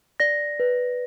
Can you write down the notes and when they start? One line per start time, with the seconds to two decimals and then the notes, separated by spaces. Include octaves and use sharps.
0.20 D5 A#6
0.60 B4